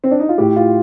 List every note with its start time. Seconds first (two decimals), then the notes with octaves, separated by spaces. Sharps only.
0.04 C4
0.11 D4
0.20 D#4
0.29 F4
0.38 A2 G4
0.56 F4